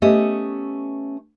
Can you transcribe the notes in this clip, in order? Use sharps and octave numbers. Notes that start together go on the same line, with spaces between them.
A3 B3 C#4 G4 D#5